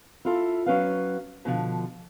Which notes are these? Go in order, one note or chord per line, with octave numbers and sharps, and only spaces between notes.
E4 F4 A4
F#3 C#4 B4 F5
B2 D3 F3